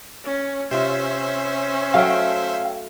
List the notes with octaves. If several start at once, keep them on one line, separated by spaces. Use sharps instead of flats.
C#4
C3 C#4 F4 C5 E5
F#3 A3 A4 F5 G5